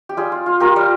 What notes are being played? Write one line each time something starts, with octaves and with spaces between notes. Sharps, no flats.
G4
G3 F4 G#4
F4
F4
F4 G4 A#4
G3